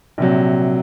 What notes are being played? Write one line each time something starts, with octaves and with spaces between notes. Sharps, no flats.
A#1 C3 F#3